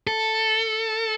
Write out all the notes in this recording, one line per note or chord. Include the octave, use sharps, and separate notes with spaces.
A4